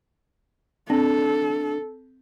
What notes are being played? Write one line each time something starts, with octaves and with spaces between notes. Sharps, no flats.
C4 D4 A4